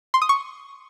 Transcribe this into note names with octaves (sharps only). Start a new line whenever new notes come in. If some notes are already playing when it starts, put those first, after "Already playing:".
C6
D#6
C#6